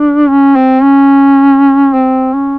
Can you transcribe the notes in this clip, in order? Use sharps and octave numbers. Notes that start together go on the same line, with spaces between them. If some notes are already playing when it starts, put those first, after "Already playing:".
Already playing: D4
C#4
C4
C#4
C4
C#4